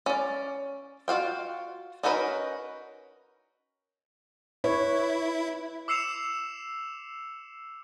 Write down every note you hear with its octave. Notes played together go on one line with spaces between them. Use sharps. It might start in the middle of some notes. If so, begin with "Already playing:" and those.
C#4 D5
F4 F#4 F5 G5
C#4 D#4 F#4 A#4 B4
E4 B4 C#5
D6 E6 C7 C#7 E7 F7